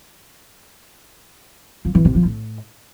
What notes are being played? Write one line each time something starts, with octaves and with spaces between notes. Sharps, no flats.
F3
E3
C3
F3
A2